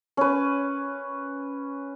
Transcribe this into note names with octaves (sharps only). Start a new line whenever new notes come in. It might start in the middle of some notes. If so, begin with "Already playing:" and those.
C#4 B4